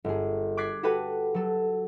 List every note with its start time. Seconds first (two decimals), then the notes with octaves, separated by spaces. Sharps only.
0.04 G1 G#4
0.57 D6 F#6 G#6 A6 B6 C7
0.83 F#4 G4 A4 B4 F#5
1.34 F#3 A4